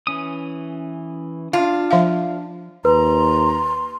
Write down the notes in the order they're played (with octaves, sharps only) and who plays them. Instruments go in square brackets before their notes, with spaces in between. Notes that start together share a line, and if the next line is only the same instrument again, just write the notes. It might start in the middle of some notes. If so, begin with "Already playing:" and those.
[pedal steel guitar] E3 C#4 D#6
[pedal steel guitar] D4 [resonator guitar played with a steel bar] F4
[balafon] F3 E5 F5
[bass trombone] D#2 [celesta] B4 [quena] A#5 [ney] C6